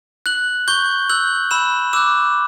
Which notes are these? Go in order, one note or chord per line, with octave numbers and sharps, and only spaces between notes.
F#6 F#7
C#6 G6 G7
E6 F#6 G6 F#7
B5 E6 E7
D6 E6 F#6 E7